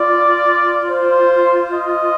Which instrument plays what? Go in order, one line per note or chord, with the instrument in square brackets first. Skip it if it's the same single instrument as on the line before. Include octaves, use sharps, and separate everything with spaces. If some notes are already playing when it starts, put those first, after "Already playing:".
Already playing: [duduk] F4 [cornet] D5
[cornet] C5
D#5